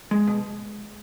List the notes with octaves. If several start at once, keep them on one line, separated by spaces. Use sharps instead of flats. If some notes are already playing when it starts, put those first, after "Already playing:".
G#3
B2